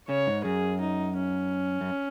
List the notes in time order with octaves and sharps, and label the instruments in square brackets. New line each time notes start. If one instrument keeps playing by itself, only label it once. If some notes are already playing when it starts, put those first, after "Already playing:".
[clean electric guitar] C#3 [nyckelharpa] C#5
[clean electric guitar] G#2
[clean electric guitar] F#2 [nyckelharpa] G#4
[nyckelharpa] D#4
C#4
[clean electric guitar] F#2